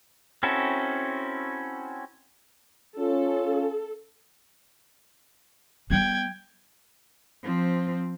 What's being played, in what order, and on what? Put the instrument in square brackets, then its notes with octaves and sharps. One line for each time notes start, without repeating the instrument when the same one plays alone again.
[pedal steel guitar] C4 C#4 E4 F#4 A4
[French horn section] C#4 F4 [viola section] A4
[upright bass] G3 B3 [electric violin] G5 G#6
[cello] F3 C4